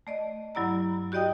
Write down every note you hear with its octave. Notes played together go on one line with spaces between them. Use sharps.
A3 D5 D#5
G2 F#3 E4 D5 A#5
F#4 G4 D5 D#5 G5 D#6